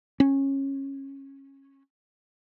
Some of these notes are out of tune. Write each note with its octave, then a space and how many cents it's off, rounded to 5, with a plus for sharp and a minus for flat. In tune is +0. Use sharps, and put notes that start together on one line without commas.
C#4 -20